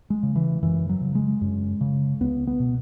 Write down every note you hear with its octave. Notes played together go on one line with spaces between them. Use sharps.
G#3
C#3
E3
F#2 E3
F#3
C#3
G#3
F#2
C#3
C#2 B3
B3
B2